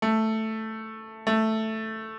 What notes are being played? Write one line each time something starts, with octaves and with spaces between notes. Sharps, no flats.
A3
A3